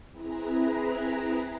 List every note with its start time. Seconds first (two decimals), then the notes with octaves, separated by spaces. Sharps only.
0.10 C4 E4 G#4 B4 A#5